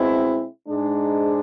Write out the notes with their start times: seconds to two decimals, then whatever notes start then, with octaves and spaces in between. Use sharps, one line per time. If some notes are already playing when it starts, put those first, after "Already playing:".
Already playing: B2 G#3 C4 E4
0.68 G#2 G#3 D4